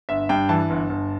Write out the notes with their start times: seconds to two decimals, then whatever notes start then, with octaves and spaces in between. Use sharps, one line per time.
0.09 G1 E5
0.29 G2 G5
0.49 E3 A5
0.70 G1
0.89 G1